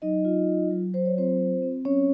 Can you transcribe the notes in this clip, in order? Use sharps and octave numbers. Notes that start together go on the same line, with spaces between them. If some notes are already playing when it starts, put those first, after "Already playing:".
F#3 D#4 D#5
F4
F#3
F#3
F#3 C5
C#5
C4 F4 C5
C4
C4
F#3 C#4 C#5